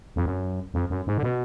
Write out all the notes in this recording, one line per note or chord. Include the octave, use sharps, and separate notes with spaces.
F2
F#2
F2
F#2
G#2
D3
B2